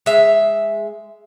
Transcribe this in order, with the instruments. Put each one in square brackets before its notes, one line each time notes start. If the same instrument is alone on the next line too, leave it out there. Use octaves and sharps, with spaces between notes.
[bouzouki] G#3 E5